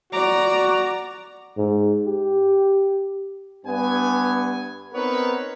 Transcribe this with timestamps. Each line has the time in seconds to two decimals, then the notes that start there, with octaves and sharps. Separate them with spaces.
0.13 F#4 D5 A#5
1.57 G#2
2.07 G4
3.66 G2 B3 G#5
4.94 B3 C4 D#4 A#4 B4 C#5